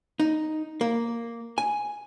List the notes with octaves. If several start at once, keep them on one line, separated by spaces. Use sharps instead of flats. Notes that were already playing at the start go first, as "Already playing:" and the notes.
D#4
A#3
G#5